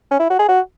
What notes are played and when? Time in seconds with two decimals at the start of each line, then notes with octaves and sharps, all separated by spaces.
0.11 C#4
0.20 E4
0.30 F#4
0.39 G#4
0.49 F#4